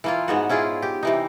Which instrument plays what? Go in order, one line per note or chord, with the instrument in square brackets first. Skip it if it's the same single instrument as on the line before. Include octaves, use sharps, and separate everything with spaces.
[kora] E3 A#3 F4
G#2 B3 F#4
C#4 E4 F4 G#4
G4
C3 E3 D#4